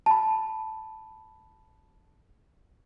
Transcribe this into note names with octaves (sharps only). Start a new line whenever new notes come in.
A5 B5